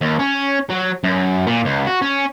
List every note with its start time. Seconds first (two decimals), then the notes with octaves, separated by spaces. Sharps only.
0.01 D#2
0.19 C#4
0.70 F#3
1.04 F#2
1.47 A#2
1.65 C#2
1.86 F#4
2.01 C#4